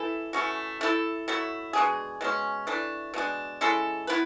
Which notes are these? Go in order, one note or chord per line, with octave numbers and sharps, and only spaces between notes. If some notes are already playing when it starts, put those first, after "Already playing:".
Already playing: E3 A3 E4 A4
E3 A3 C#4 F#4
A3 E4 A4
F#3 A3 E4
B2 G#3 D4 G#4
B2 G#3 C#4
E3 A3 D4
B2 G#3 D4
G#3 C#4 E4 A4
B3 E4 B4